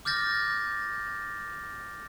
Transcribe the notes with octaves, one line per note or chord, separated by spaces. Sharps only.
D6 F6 G6 A6 A#6